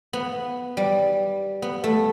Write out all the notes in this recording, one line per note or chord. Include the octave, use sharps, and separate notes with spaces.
B3
G3
B3
A3